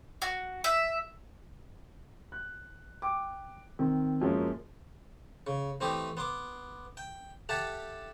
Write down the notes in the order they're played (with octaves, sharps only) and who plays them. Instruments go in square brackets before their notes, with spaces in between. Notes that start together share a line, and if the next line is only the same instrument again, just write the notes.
[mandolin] F#4
E5
[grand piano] F#6
G5 D6
D#3 C4
F#2 F3 G#3 A#3 C#4
[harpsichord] C#3
E3 A3 C4 G4 D#5
B3 C6 D6
G5
G4 A4 E5 F#5 A5